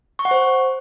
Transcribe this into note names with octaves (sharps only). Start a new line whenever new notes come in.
C#6
F#5
C5